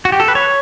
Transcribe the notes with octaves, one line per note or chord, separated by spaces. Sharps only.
F#4
G4
A4
B4
C#5